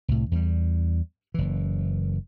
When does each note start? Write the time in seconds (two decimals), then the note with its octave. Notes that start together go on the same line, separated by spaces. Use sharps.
0.08 C2 A2
0.31 E2 G3
1.34 F#1 E3